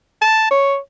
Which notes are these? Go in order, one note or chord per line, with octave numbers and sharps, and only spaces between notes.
A5
C#5